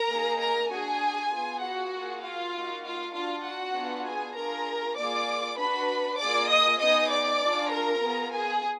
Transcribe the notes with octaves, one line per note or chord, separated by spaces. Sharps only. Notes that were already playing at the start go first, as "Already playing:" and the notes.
Already playing: A#4 A#5
A#3 D#4 G#4
A#4 A#5
D4 F#4 G#4 G#5
B3 F4 G#4
F#4 F#5
A#3 F4 G#4
F4 F5
A#3 D#4 F#4
F4 F5
D4 F4 F#4 F5
F#4 F#5
B3 D4 F4 G#4
G#4 G#5
D4 F4 G#4 A#4 A#5
A#3 F4 G#4 D5 D6
D4 F#4 B4 B5
A#3 F4 G#4 D5 D6
D#5 D#6
B3 D#4 G#4 D#5 D#6
D5 D6
D4 F4 G#4
A#4 A#5
B3 F4 G#4
G#4 G#5